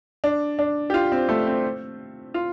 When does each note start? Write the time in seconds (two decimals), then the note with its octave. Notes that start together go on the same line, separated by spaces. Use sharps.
0.24 D4
0.59 D4
0.90 G4
0.94 F4
1.12 C4
1.29 A3
1.47 C4
2.34 F4